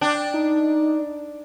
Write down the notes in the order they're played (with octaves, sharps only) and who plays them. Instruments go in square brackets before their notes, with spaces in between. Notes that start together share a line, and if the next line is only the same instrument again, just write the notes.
[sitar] D4 [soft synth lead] G5
[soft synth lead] D#4